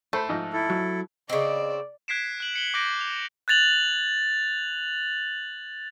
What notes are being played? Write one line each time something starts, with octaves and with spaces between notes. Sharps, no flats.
A3 A4 C5 B5
G#2 F3 D#5
E4 A4
F#3
C#3 C4 D5 D#5
F#6 G#6 B6 C7 D7 E7
F#6 F#7
C#7 F#7 G7
D6 F#6 G6 A#6 D7
F7
F#6 G#6 A6 F7 F#7